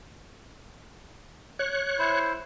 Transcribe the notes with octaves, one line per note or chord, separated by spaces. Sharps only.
C#5 F#6
E4 C5